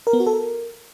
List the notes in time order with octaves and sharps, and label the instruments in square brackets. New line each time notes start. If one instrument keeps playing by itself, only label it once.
[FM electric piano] A#4
B3
F#4
A4
A#4